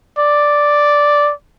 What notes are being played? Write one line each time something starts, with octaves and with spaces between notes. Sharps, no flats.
D5